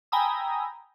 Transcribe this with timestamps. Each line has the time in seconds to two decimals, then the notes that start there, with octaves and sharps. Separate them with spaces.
0.12 G5 G#5 A#5 B5 D#6 E6